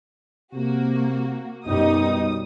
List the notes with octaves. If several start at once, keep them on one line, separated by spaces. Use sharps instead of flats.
C3 A#3 F#4
F#2 B2 G3 D#4 D#6